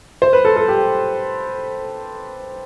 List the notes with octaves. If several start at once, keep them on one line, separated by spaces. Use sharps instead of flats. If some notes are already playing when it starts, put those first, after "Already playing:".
C5
B4
A4
A4
G4